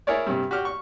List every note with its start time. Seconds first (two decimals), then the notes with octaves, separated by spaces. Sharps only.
0.07 E4 G#4 A#4 C#5 D5
0.26 G2 C3
0.51 F#4 G4 F6
0.65 C#6